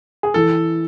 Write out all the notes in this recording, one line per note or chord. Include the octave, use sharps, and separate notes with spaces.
G#4
E3 A4